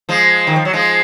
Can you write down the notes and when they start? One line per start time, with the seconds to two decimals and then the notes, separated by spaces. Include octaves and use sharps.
0.09 F3 G#3
0.47 D#3
0.56 F3
0.65 F#3
0.73 F3 G#3